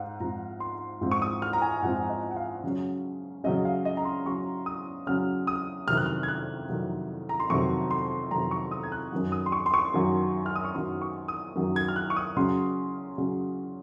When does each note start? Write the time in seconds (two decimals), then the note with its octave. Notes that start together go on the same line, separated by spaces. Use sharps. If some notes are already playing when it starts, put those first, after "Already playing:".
Already playing: G#2 F5 F#5
0.20 G#2 F3 C4 A#5
0.60 C6
1.01 G#2 F3 C4
1.11 C#6
1.22 D#6
1.42 F6
1.53 A#5
1.62 G#5
1.82 G#2 F3 C4 F#5
2.09 D#5
2.31 F#5
2.36 F5
2.64 C#3 F#3 C#4
3.44 C#3 F#3 C#4 D#5
3.65 F5
3.85 D#5
3.97 A#5
4.05 C6
4.26 C#3 F#3 C#4 C#6
4.66 D#6
5.07 C#3 F#3 C#4 F6
5.47 D#6
5.88 F2 C3 D#3 F#3 F6
5.97 F#6
6.06 F6
6.23 G#6
6.28 F#6
6.69 F2 C3 D#3 F#3
7.29 A#5
7.40 C6
7.50 F2 C3 D#3 F#3 C#6
7.91 C6
8.31 F2 C3 D#3 F#3 A#5
8.51 C#6
8.71 D#6
8.83 G#6
8.92 F#6
9.12 F#2 D#3 F#3
9.32 D#6
9.46 C6
9.52 C#6
9.66 C6
9.74 C#6
9.94 F#2 D#3 F#3
10.46 F6
10.55 D#6
10.65 C#6
10.74 F#2 D#3 F#3 C6
11.02 C#6
11.28 D#6
11.55 F#2 D#3 F#3
11.76 G#6
11.88 F6
11.96 F#6
12.10 C#6
12.16 D#6
12.37 C#3 F#3 C#4 C6
13.18 C#3 F#3 C#4